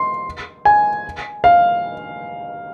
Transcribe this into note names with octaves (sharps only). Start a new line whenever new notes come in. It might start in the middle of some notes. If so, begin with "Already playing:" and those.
Already playing: C6
G#5
F5